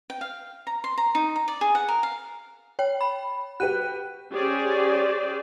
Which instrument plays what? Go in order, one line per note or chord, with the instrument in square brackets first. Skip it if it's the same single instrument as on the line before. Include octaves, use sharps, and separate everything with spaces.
[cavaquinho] G5
F5
A#5
C6
A#5
D#4
A#5
D5
G#4
F#5
A#4
F5
[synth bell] C#5 G5
B5
[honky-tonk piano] F#4 G4 B4 [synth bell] F#6 D#7
[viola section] C#4 G4 G#4 C5 D5